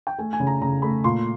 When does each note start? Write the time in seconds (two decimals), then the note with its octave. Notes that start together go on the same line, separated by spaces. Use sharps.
0.07 G5
0.19 A3 G#5
0.33 G#5
0.40 C#3
0.47 A#5
0.61 C#3 A#5
0.82 A3 B5
1.04 A#2 C6